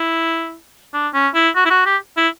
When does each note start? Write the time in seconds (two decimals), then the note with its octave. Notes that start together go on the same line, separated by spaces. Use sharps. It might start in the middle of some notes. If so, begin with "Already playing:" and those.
Already playing: E4
0.94 D4
1.14 C#4
1.34 E4
1.55 F#4
1.65 E4
1.70 F#4
1.86 G4
2.17 E4